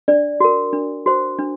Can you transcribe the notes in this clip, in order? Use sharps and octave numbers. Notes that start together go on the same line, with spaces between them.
D4 D5
F#4 A#4
D4
F#4 C5
D4